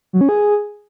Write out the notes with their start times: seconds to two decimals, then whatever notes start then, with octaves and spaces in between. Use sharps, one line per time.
0.13 F#3
0.21 C#4
0.29 G#4